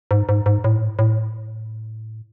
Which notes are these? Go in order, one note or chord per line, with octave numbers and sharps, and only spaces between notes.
G#2
G#2
G#2
A2
A2